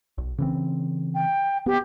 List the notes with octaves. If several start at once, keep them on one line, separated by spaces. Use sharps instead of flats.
B1
C#3 E3 C4
G5
B3 G4